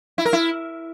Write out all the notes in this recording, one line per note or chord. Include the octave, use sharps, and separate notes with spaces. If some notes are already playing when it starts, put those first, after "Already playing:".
E4
A#4
E4